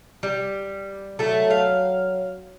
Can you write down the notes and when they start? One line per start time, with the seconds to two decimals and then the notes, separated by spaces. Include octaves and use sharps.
0.23 G3
1.19 F#3 A3 A4
1.51 F5